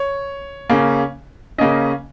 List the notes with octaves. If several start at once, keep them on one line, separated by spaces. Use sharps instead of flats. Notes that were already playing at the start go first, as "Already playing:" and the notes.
Already playing: C#5
C#3 A#3 C#4
C#3 A#3 C#4 D#5